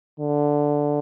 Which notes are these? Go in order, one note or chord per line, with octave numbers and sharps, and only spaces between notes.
D3